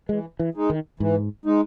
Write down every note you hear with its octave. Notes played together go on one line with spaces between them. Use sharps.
E3 G#3
E3
G#3 D#4
D#3
G#2 E3
G#3 D#4